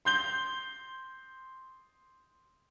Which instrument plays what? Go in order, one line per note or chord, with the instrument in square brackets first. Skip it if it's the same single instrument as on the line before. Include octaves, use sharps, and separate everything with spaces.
[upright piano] C6 G6 G7